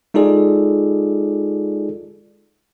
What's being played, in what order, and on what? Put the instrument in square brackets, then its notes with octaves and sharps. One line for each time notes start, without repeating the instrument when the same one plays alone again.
[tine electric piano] G#3 D#4 F4 G#4 A4 D5